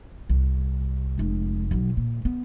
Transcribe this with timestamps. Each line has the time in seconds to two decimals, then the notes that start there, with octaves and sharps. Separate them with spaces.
0.29 C2
1.18 F1 G#3
1.71 B1 F#3
1.97 A#2
2.25 B3